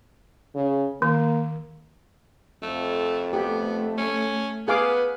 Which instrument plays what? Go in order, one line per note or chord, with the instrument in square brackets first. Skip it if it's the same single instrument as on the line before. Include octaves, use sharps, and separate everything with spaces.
[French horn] C#3
[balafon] D#3 [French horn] A#3
[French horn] F2 [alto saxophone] A3
[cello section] A3 [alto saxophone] B3 [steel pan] G4
[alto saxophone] C#4
[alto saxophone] B3 [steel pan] G#4 F5 D6 [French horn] B4